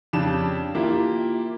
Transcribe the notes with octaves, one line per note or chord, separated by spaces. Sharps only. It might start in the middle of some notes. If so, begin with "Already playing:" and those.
F2 C#3 D4 G4 E7
A#3 E4 F4 G4